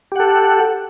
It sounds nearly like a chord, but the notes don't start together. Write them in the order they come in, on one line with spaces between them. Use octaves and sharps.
G4 F#5 A4